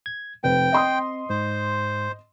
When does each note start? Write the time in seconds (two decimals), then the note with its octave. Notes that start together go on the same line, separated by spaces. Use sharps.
0.06 G#6
0.44 F1 C4 B4 G5
0.72 D#5 C6 D#6
1.30 G#2 C5